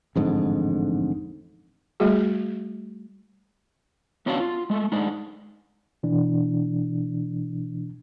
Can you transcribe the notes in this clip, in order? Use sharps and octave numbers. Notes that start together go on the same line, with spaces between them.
A1 F2 G#2 D3
G3 A3 F#4 G#4
B3 C#4 D4 F#4 D5 F5
F4
G#3 A3
G#3 D4 D#4
B2 E3 D4